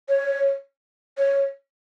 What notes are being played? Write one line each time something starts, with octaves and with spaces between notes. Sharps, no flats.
C#5
C#5